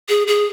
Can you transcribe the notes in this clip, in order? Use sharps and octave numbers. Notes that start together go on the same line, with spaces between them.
G#4
G#4